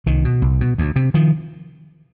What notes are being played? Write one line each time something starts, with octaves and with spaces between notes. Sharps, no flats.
C2 D#3
B2
C2
B2
D2
C3
D#3 F3